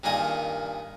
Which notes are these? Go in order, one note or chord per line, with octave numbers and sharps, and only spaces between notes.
G2 A#2 D#3 G#4